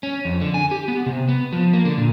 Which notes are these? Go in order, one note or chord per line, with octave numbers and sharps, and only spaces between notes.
C#4
F2
D3
G#5
G4
B3
C3
B3
F3
A#3
D3
A#2